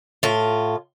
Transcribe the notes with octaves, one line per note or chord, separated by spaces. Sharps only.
A2 F4